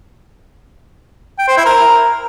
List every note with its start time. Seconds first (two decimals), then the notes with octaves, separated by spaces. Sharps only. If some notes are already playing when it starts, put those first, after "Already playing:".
1.39 G5
1.48 C5
1.57 E4
1.66 A#4